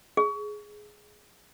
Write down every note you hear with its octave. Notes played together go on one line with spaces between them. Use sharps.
G#4